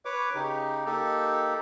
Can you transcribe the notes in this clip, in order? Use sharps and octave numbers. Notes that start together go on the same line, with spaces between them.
B4 C#5 D6
C#3 D#4 G4
A#3 D#4 G4 A4